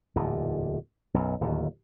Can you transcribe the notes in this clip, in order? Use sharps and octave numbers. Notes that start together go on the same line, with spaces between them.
D1 E2 A#2
B1 F#2
D1 D#2